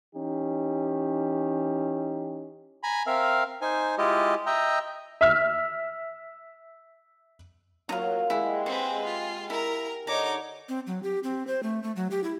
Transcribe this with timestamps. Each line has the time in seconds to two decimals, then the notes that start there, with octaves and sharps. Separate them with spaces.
0.16 E3 C#4 D#4 G4
2.83 G#5 A#5 B5
3.07 C4 A#4 E5 F5
3.62 D#4 C5 G#5
3.98 G#3 E4 F4 G4 D#5
4.46 D#5 E5 G5 A#5
5.21 E5 F6
7.89 F#3 A#3 D#4 F4
8.30 G#3 E4 G4 G#4 F#5
8.66 C4 B4 C6
9.05 F4
9.50 E4 A#4 A#5
10.07 D3 D#4 C#5 A#5 D6
10.69 C4
10.87 F#3
11.03 G4
11.23 C4
11.47 C5
11.63 A3
11.83 A3
11.96 F#3
12.11 G4
12.24 E4